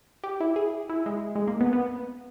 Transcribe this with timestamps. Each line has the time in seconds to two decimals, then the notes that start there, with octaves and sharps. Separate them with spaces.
0.24 G4
0.40 E4
0.56 G#4
0.90 E4
1.06 G#3
1.35 G#3
1.47 A#3
1.61 B3
1.73 B3